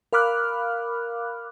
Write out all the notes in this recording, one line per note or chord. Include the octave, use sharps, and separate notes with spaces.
A#4 F5 B5 D6 F6 F#6